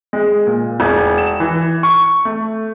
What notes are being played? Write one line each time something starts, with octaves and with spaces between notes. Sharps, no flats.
G#3
A#2
E1
E7
E3
C#6
A3